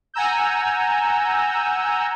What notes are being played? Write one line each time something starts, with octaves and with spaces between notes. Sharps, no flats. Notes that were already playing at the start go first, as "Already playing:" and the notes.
F#5 G#5 A#5 E6 G6